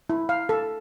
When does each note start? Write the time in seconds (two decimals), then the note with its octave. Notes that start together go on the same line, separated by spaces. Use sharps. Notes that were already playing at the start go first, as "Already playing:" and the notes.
0.10 E4
0.29 F5
0.49 A4